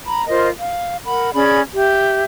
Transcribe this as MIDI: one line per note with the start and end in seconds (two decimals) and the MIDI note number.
0.06 0.27 82
0.06 0.27 83
0.28 0.49 65
0.28 0.49 70
0.28 0.49 72
0.28 0.49 75
0.60 0.97 77
1.05 1.31 70
1.05 1.31 78
1.05 1.31 83
1.33 1.61 61
1.33 1.61 68
1.33 1.61 74
1.33 1.61 83
1.74 2.24 67
1.74 2.24 76